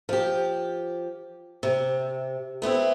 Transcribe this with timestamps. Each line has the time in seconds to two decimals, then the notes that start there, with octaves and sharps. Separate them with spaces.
0.09 F3 G4
1.63 C3
2.62 A3 B3 C4 E4